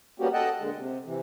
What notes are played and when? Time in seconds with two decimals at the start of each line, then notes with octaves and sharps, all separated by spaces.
0.20 G3 A#3 B3 C#4 F#4 G4
0.33 A4 D#5 F#5 G5 A5
0.60 A#2 D3 G#3
0.76 C3
1.05 C3 E3